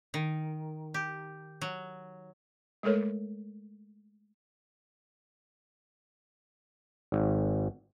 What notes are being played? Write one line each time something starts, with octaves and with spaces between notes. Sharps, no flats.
D#3
G4
F#3
G#3 A3 A4 A#4 C#5
G#1